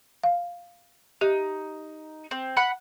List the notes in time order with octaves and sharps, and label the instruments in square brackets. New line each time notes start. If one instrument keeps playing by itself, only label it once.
[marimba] F5
[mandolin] D#4 [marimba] G4
[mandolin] C4
F#5 B5 F#6